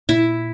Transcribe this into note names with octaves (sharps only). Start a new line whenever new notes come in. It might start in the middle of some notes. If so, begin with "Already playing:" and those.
A#2 E4